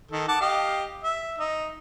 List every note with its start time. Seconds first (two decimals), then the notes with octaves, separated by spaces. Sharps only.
0.11 D#3 A4
0.28 F#5 A5 D6
0.41 G4 D#5 F5
1.03 E5
1.38 D#4